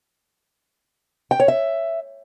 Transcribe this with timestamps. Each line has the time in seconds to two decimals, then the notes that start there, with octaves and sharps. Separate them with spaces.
1.31 G5
1.40 C#5
1.48 E5